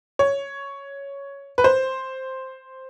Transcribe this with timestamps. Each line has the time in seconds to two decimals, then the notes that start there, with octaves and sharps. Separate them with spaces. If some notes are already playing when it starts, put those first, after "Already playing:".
0.19 C#5
1.58 B4
1.64 C5